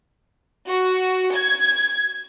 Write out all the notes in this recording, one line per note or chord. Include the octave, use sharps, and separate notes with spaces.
F#4
G#6